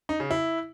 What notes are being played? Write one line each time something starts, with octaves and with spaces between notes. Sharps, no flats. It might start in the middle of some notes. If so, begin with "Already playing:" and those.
D#4
C#3
E4